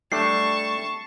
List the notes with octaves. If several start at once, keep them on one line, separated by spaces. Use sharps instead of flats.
G3 A3 D4 A5 C#6 C7